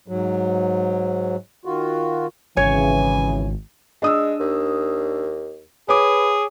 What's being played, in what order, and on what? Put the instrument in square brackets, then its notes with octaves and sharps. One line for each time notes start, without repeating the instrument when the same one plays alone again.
[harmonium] G#2 F#3
D#3 F4 F#4
[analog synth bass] G#1 [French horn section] C#3 E3 [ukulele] C#5 [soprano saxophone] G#5
[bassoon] G#3 [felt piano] D4 D#6 E6
[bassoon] D#2
[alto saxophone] G#4 [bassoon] B4 [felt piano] C#5 D6